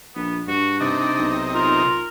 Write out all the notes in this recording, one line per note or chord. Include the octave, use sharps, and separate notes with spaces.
A#1 B3
G2 D4 F#4
C3 D#4 D5
B1
F4 A#4